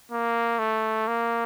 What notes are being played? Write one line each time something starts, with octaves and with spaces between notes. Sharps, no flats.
A#3
A3
A#3